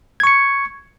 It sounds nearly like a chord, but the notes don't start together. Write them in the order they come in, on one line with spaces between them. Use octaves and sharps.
G#6 C#6 C#7